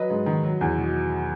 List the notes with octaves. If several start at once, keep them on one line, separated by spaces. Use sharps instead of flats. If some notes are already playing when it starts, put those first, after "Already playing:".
Already playing: F#3 B4 D#5
G#2
D#3
F#3
E2
B2